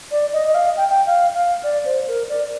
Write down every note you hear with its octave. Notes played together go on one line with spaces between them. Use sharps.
D5
D#5
D#5
F5
G5
G5
F5
F5
D5
C5
A#4
D5